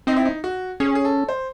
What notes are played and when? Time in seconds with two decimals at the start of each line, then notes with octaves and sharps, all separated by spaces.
0.07 C4 D#4
0.16 E4
0.25 D#4
0.44 F#4
0.80 C#4 G#4
0.95 G#4
1.05 A4
1.29 C5